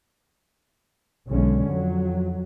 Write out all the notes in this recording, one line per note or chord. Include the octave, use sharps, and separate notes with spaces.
B1 D3 G#3 C#4
F2 F#3